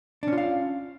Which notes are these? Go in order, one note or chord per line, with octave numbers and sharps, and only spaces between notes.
C#4 D4 F4 F5